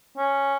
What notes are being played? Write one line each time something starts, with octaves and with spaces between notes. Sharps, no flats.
C#4